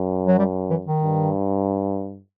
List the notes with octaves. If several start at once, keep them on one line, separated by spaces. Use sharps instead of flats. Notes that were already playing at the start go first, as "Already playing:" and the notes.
Already playing: F#2
F#3
G3
E3
D#3
G2